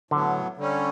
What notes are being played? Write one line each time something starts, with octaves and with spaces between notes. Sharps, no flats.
A2 D3 F#3 B3
D3 G3 C#4